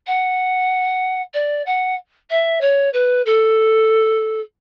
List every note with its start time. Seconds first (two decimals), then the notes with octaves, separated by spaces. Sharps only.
0.07 F#5
1.34 D5
1.66 F#5
2.30 E5
2.61 C#5
2.93 B4
3.26 A4